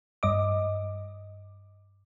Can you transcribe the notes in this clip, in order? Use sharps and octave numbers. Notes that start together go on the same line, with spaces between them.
G2 D#5 D6